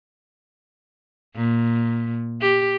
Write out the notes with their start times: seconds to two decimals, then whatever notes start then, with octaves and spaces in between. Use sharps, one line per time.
1.35 A#2
2.41 G4